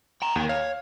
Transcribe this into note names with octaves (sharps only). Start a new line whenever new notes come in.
G5 A#5
D#2 A#4 G5
C#5 F5